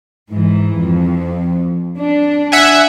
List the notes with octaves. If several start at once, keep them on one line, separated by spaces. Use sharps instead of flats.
G#2 E3
F2
D4
E5 F#5 G#5